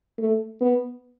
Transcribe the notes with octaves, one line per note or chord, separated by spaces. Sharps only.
A3
B3